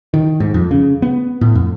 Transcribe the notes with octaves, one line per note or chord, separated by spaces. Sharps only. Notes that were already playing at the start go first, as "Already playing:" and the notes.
D#3
G#2
F2
C#3
B3
A2
F2